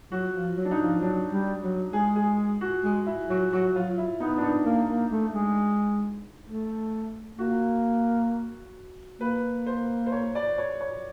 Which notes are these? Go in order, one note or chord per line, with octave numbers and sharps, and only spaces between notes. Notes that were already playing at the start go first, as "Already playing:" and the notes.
F#3 F#4
F3
F#3
D4
D#4
F3
F#3 D4
G3
F#3
G#3 G#4
G#4
F#4
G#3
E4
F#3 F#4
F#3 F#4
F#3 F4
E4
B3 D#4
D4
D#4
A#3
A#3
A3
G#3
A3
A#3 F#4
A#3 B4
C5
C5
C#5
D5
C#5
C#5